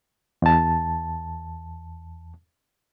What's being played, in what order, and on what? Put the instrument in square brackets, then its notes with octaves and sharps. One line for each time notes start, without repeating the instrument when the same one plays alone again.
[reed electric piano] E2 A5